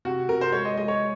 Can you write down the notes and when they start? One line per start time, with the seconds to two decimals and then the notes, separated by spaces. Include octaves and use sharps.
0.05 C3 F#4
0.29 C3 A#4
0.41 C5
0.52 G#3 C#5
0.65 D#5
0.77 G#3 D#5
0.88 C#5